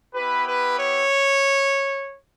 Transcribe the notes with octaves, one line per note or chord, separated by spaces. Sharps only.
B3 E4 G4 B4
B4
C#5